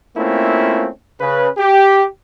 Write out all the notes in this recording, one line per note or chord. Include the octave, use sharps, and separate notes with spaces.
A3 A#3 C4 C#4 E4 F4
C#3 B4
G4